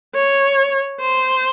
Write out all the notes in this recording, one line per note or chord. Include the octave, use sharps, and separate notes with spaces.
C#5
C5